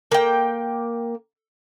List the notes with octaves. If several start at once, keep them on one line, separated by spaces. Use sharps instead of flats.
A#3 G5